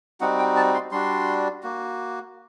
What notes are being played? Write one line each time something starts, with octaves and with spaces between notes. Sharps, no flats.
G3 C4 D#4 F#4 F#5
G5
A5
C6
G3 D4 F#4 C6
A#3 F#4